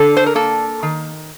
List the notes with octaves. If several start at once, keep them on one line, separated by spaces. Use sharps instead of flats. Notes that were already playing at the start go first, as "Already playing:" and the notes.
Already playing: D3 A4
C5
A#4
A#3 A4
D#3